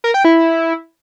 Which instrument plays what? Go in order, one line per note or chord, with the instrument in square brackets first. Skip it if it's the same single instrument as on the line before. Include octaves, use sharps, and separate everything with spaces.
[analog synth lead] A#4
G5
E4